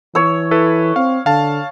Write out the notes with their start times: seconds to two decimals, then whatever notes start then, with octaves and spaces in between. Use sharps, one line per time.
0.15 E3 C#5 E6
0.51 E4 A4 B4
0.96 C4 F5
1.26 D3 F5 A5